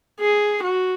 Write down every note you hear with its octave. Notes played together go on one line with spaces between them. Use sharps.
G#4
F#4